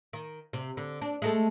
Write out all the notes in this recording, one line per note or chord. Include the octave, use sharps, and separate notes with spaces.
D#3
C3
D3
D4
G#3 A3 A4